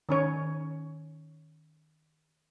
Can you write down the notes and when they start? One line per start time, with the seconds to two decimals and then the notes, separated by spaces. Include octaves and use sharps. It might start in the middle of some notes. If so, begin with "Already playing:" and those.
0.09 D#3 C#4 C#5